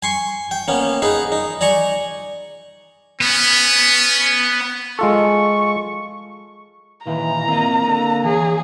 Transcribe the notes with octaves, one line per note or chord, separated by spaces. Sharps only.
G#5 C6 C#6
G5
A#3 B3 C#4
D#4 G#4 B4
D#4
D5 G#5 A#5 C#6
B3 C#4
G#3 F4 A4 C#6
A#2 D#3 E3 F5 A#5
A#3 C4 F4 D#5
D3
E3 G#4 C#5